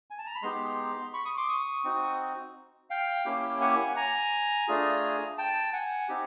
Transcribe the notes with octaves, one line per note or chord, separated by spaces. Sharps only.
G#5
A5
A#5
B5
G#3 B3 D#4 G4 A#5 C6
B5 C#6
C#6 D#6
C6 D6
C#6 D#6
C4 D#4 F#4
F5 G5
A#3 C#4 E4 G4
F#5 G#5
G#5 A#5
A3 D4 F4 G#4
G5 A5
F#5 G#5
C4 D#4 G4